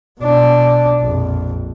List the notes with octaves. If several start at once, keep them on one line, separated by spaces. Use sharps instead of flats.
B2 D4
A#1 F2